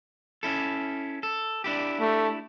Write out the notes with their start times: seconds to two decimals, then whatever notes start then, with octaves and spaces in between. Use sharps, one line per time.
0.43 C#4 E4 A4
1.23 A4
1.64 D4 E4 G4
2.00 A3